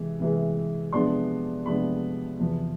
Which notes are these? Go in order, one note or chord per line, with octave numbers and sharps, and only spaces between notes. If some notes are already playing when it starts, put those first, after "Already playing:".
Already playing: C3 E3 G#3
C3 E3 G#3
C3 F3 G#3 B3 D4 C6
C3 F3 G#3 B3 D4 B5
E2 C3 F3